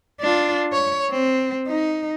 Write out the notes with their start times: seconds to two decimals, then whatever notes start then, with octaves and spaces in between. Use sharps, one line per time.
0.21 D4 F4
0.73 C#5
1.11 C4
1.68 D#4